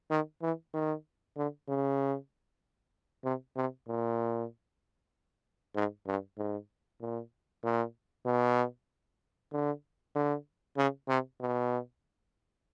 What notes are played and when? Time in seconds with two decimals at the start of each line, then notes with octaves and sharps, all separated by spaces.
0.11 D#3
0.42 E3
0.74 D#3
1.37 D3
1.68 C#3
3.24 C3
3.56 C3
3.88 A#2
5.75 G#2
6.07 G2
6.38 G#2
7.01 A#2
7.64 A#2
8.26 B2
9.52 D3
10.15 D3
10.77 C#3
11.08 C3
11.41 B2